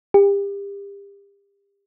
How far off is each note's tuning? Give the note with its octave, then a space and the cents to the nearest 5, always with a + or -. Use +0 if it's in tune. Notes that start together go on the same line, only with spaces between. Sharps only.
G4 +35